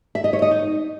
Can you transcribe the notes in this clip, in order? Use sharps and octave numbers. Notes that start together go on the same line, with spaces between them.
E5
D#5
C#5
D#5
D#4